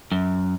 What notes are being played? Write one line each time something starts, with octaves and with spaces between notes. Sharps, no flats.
F#2